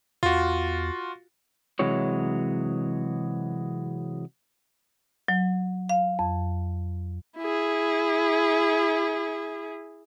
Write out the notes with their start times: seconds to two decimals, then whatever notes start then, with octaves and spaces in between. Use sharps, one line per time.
0.23 E2 F4 F#4
1.79 C3 E3 F#3 G#3 C#5
5.28 F#3
5.89 F5
6.19 F2
7.38 E4 G#4